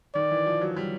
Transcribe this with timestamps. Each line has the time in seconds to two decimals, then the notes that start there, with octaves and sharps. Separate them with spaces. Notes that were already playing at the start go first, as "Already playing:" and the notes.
0.15 D#3 D5
0.31 E3
0.46 F3
0.61 F#3
0.76 G3